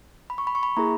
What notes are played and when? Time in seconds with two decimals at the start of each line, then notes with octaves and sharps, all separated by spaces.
0.30 B5
0.38 C#6
0.47 B5
0.55 C#6
0.63 B5
0.77 A#3 E4 G#4 A#5